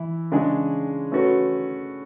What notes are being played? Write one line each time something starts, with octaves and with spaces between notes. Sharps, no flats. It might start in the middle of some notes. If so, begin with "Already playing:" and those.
Already playing: E3 E4
C#3 G#3 D4 G#4
A3 C#4 F#4 B4